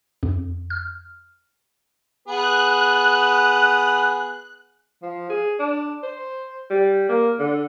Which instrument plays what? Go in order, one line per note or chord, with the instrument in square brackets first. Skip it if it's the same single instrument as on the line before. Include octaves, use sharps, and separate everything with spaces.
[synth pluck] F2
F6
[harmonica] B3 G#4 B4 [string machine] F#6
[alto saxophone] F3
G#4
D4
C5
G3
A#3
D3